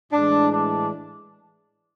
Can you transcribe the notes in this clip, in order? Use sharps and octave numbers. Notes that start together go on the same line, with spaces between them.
A2 E3 G#3 D4
D4